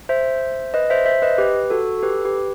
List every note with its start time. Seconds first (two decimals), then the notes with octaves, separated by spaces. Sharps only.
0.09 C5 E5
0.74 B4 D#5
0.90 C5 E5
1.06 C5 E5
1.22 B4 D#5
1.38 G4 B4
1.70 F#4 A4
1.99 A4
2.03 G4 B4
2.25 G4 B4